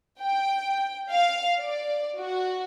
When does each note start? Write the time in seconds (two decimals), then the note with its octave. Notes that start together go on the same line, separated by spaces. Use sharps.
0.21 G5
1.11 F5
1.60 D5
2.19 F#4